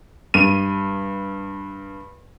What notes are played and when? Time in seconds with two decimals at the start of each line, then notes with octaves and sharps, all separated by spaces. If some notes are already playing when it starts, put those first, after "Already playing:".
0.34 G2 D#7